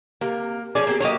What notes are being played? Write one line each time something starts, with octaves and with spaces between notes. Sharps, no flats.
C3 A#3
F3 C#4 G#4 D5
A#3 C4 G4
F#3 A#3 G4 C#5 D#5